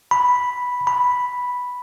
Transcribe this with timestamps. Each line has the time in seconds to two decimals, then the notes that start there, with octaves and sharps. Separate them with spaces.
0.11 B5
0.87 B5